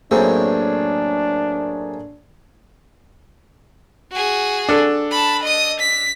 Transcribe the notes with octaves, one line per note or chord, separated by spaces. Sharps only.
F#2 A2 A3 A#3 C4 D4 G#4
F#4 G#4
D4 A4
A5 B5
D#5 D#6
B6